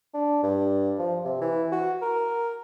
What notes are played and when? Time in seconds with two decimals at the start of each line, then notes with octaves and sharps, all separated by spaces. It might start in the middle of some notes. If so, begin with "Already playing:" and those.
0.14 D4
0.43 G2
0.99 F3
1.25 C3
1.41 E3
1.72 F#4
2.02 A#4